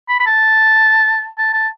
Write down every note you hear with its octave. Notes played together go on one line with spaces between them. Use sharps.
B5
B5
A5
A5
A5